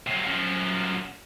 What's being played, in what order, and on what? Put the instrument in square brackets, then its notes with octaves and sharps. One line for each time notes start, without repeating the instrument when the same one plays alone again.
[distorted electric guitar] C3 F#3
F#2 F3